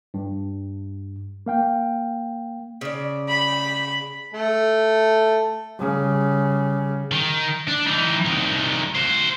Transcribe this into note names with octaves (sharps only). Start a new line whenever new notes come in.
G2
A#3 F5 G5
C#3 D5
B5
A3 A4
C#3 G3
D#3
D4
E3 D#4
C2 D#3
F#4 C5